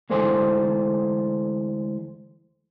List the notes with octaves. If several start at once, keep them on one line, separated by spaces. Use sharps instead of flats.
D2 E3 G#3 A4 C5 G#5